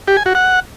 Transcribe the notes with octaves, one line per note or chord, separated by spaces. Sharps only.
G4
G#5
F#4
F#5